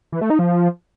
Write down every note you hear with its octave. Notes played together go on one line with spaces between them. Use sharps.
E3
A3
D#4
F3